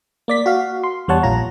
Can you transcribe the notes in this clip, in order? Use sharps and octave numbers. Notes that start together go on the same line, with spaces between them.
A#3 D5 B6
F#4 F5
C6
E2 G3 C#5 F#5 A5
A#1 A#2 F4 A#5